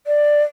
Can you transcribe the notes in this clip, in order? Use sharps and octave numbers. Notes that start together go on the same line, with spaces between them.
D5